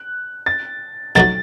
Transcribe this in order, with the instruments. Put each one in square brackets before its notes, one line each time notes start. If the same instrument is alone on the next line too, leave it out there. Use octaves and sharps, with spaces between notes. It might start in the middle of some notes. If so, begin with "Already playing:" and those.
Already playing: [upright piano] F#6
A6
[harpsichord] B2 F#3 A3 D#4 F#4 [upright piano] A6